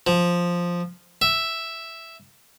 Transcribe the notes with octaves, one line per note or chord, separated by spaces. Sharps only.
F3
E5